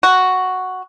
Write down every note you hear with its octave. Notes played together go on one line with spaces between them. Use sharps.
F#4